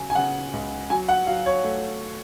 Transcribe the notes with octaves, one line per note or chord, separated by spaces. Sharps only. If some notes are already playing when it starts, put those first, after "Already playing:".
Already playing: C#3 F#3 G#5
G#5
C#3 F#5
C#2
F#3 G#5
F#5
F#3 F5
C#5
A3